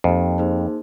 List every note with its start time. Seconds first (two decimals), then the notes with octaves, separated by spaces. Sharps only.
0.04 F2 A#3 D#4 G4
0.38 A#3 D#4 G#4 C5